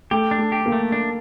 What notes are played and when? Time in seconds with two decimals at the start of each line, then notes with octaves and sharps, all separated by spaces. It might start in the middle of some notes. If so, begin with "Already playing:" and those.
0.11 A3 G4
0.31 D4
0.38 A3
0.52 G4
0.66 A#3
0.72 A3
0.92 D4